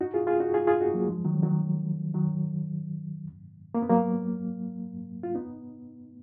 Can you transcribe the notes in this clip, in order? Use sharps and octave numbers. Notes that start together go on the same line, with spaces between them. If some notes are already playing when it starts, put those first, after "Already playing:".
D#4 F#4
F4 G#4
F4 G#4
D#4 F#4
F4 G#4
F4 G#4
D#4 F#4
F#3 A#3
F3 G#3
D#3 F#3
D#3 F#3
D#3 F#3
A#3
B3
F#3 A#3
F4
B3 D#4